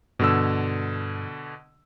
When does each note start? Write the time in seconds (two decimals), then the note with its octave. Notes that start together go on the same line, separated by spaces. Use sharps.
0.19 G2 B2 D3 E6